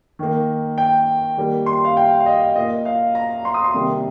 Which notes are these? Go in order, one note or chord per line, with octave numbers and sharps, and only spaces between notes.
D#3 A#3
G5
D#3 G3 A#3
C6
F5
G5
F5
D#5
A#2 A#3 D#5
F5
A#5
C6
D#6
C6
C3 D#3 G3 A#3